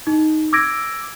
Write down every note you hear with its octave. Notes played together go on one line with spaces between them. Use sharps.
D#4
D6 E6 G#6 A#6 D7